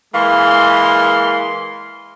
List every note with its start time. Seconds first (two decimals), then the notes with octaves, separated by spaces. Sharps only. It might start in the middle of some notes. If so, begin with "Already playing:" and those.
0.13 E3 G#3 A#3 F5 C6